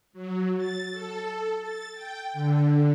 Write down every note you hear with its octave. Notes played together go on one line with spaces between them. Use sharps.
F#3
A6
A4
A6
G5
D3